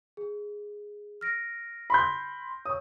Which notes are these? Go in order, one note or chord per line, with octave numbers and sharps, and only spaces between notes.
G#4
F6 A#6 D7
B5 C6 G6
C#5 C#6 D#6